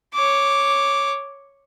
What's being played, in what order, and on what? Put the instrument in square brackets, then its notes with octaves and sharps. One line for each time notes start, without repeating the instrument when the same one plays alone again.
[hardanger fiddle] C#5 D6